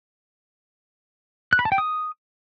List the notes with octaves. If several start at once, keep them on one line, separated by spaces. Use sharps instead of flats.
F#6
B5
A5
G5
D#6